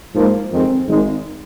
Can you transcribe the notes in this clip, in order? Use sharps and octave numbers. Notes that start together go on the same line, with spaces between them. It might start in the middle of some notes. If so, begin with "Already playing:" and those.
G#2 F3 A#3
F2 D#3 G#3 C4
G#1 G#2 D#3 G#3 D#4